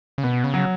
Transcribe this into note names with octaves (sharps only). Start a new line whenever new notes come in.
C#3
B2 B3
C#3
F#3